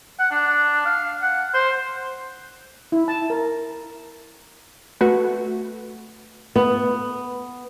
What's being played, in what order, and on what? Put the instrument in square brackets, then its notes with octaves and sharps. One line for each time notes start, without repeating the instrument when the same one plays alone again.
[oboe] F#5
D4
F5
F#5
C5
[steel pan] E4
A5
A#4
[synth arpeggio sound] A3 F#4 B4
[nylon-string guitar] B3